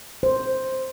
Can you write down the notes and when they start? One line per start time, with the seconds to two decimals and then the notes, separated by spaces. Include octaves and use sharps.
0.23 C5